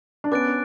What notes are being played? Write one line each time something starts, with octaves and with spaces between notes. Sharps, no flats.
D4
B3 C#4 D6 F#6 A6 D7